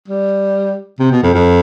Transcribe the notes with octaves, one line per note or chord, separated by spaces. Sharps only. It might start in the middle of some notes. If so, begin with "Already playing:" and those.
G3
C3
B2
F2
F2